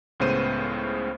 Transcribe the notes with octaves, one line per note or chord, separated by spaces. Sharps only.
C#2 A2 C#3 B3 C5 D#7